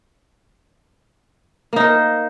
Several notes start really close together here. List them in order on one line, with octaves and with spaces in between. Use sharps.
A#3 D#4 A#4 C5